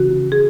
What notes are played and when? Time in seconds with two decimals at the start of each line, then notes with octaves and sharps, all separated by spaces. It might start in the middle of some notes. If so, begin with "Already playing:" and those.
Already playing: C#3 E3 C#4 F#4
0.32 G#4